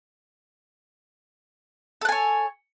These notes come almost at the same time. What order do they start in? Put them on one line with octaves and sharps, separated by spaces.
A4 F#5 G#5 C#5